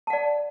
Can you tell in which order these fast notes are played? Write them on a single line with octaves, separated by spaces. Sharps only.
A5 F#5 D5